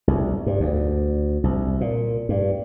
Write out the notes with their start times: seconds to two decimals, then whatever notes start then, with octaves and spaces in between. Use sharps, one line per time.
0.08 C2
0.46 G2
0.60 D2
1.44 C2
1.81 A#2
2.29 G2